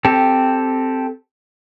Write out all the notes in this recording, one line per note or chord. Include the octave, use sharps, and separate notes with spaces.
C4 G4 A4